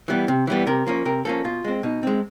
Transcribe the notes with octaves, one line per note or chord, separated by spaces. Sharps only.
E3 G3 B3
C3
E3 G3 B3
C3 A#4
F3 A#3 C#4
C3 A#4
F3 A#3 C#4 A4
B2 F4
G#3 C4
B2 D#4
G#3 C4